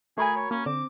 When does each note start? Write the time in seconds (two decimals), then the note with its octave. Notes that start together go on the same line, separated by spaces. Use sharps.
0.18 A3 F#4 G#4 A#4 G#5 B5
0.36 C#5
0.51 A#3 C#4
0.66 D3 C4 D6